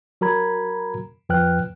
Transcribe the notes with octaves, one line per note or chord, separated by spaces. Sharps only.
F#3 F#4 A#4 A#5 B5 G#6
F2 F3 B4 G5 F6 F#6